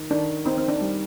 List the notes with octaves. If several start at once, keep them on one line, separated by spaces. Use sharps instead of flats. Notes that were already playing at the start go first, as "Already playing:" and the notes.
Already playing: D#3
D#3 D4
C4 D#4
C4
D4
G3